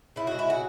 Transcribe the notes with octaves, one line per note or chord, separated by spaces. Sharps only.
C#3 E4
G#3 F#4
E4
C#3 F#4